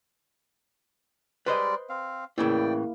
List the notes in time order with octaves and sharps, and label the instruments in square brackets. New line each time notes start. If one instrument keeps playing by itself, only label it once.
[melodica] G3 G#3 D5 [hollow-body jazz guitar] B4 C5 D#5
[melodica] C4 F5
[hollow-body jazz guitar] A2 C#3 E3 [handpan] A#3 E4 [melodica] D5 G5